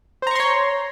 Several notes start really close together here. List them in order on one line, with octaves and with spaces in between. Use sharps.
C5 A#5 C#6 C6 C#5